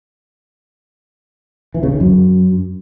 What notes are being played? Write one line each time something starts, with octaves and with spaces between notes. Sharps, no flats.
E3
C#3
D#3
F#2